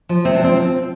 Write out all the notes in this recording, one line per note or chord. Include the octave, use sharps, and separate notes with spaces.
F3
C3 C4
D4
F3 C4
F3 C4